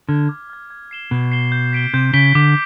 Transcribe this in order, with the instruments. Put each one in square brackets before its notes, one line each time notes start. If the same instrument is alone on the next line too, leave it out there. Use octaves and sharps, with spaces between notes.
[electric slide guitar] D3 [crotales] F6 G#6
[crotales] D6
F6 G#6
G#6
C7 E7 G7
[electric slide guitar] B2 [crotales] G#6
[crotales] C7 E7 G7
G6
B6 D7 G7
[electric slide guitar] C3 [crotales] G6
[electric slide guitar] C#3 [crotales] B6 D7 G7
[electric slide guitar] D3 [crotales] D6